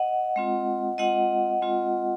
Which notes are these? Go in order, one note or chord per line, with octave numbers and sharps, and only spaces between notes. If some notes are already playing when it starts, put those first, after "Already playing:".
Already playing: D#5 F#5
G#3 C4 F4
G#3 C4 F4 D#5 F#5
G#3 C4 F4